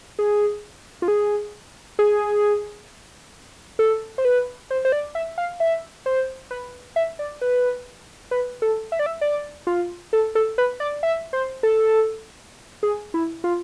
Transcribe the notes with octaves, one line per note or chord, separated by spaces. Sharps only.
G#4
F4
G#4
G#4
A4
C5
B4
C5
C5
D5
E5
F5
E5
C5
B4
E5
D5
B4
B4
A4
E5
D5
E5
D5
F4
A4
A4
B4
D5
E5
C5
A4
G#4
E4
F4